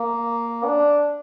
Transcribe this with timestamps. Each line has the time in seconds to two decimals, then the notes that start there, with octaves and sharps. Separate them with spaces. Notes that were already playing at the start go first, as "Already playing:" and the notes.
Already playing: A#3
0.66 D4